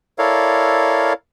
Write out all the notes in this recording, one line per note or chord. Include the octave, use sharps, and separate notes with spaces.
E4 A4 A#4 C#5 D5 F5